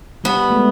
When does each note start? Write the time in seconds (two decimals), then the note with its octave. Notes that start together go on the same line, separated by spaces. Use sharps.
0.24 G3 B3
0.50 A3
0.55 G#3